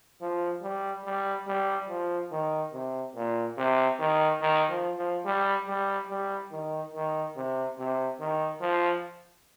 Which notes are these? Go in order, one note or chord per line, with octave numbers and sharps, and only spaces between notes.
F3
G3
G3
G3
F3
D#3
C3
A#2
C3
D#3
D#3
F3
F3
G3
G3
G3
D#3
D#3
C3
C3
D#3
F3